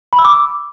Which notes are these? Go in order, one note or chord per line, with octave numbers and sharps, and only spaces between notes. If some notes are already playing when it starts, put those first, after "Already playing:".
B5
E6
D6